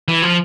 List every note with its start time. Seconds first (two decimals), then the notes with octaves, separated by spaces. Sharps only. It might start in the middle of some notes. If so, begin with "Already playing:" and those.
0.08 E3
0.22 F3